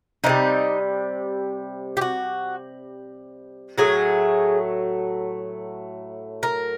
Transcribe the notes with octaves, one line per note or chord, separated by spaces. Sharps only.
C3 E3 D#4
G3
G4
F#4
A2 F#3 A3 G#4
A#4